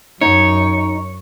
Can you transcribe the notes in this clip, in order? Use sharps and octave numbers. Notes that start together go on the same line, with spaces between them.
F#2 D#4 C#5